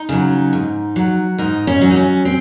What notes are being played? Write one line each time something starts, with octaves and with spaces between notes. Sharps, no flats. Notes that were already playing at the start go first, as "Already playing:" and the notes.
Already playing: D#4
C#3 F#3
G#2
F#3
G#2 D#4
C#4
F#3
D#4
C#4
C4